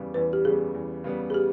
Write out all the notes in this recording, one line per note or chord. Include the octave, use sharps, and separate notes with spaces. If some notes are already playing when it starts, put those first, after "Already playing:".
Already playing: E2 C#3 G3 B3
E2 B4
G4
C#3 G3 B3 G#4
E2
C#3 G3 B3
G#4
G4